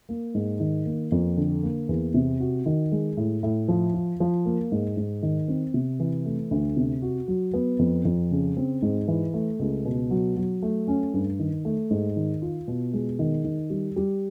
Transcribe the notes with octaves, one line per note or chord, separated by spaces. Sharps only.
A#3
G#2
D#3
A#3
F2
D3
A#3
E2
C3
F#4
D#3
G#3
A2
A2
F3
F4
F3
A#3
G#2
G#2
D#3
C4
C3
E3
A3
D2
C3
F#4
F#3
B3
F2
F2
C#3
C4
G#2
E3
A3
C#2
B2
F#3
F#3
A3
C#4
G2
D#3
A3
G#2
D#3
F4
B2
G#3
D#3
D#3
G3
G3